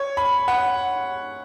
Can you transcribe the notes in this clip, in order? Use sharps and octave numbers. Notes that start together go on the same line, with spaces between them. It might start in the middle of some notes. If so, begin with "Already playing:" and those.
Already playing: C#5
B5
F#5